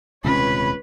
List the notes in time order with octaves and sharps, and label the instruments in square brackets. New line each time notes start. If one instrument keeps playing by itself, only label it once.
[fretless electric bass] D#1 C3 C#4 [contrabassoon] C#2 [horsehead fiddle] B4 [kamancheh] C#5 B5